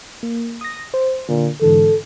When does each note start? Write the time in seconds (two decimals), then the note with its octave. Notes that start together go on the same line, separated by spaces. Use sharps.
0.23 A#3
0.61 D#6 A#6
0.94 C5
1.29 A#2 D3
1.62 G#2 D3 E3 A4